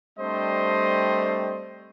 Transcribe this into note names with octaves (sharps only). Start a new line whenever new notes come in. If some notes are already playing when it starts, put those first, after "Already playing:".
G3 A3 C4 D4 C5 D#5